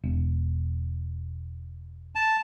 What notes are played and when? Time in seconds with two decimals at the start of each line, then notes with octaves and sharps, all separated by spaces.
0.04 E1
2.15 A5